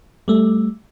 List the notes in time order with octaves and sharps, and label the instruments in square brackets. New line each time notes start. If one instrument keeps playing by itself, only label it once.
[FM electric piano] G3 A3